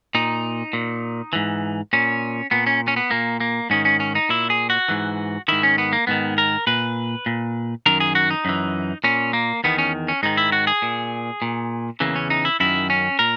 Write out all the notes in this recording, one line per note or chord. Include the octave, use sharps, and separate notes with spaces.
A#2 D#4
A#2
G#2 E3
A#2 C#4
A#2 B3
C#4
C#4
B3
A#2 A#3
A#3
G#2 D#3 C#4
C#4
C#4
D#4
A#2 E4
G#4
F#4
G#2 E3
G#2 D#3 E4
C#4
B3
A#3
G#2 D#3 B3
A#4
A#2 B4
A#2
F#2 D#3 A#4
G#4
F#4
D#4
F#2 E3
A#2 C#4
A#3
E2 D#3 B3
C#4
C#4
G#2 D#3 D#4
E4
F#4
G#4
A#2
A#2
E2 C#3 E3 A#3
C#4
D#4
E4
F#2 D#3 E4
C#4
A#2 A#4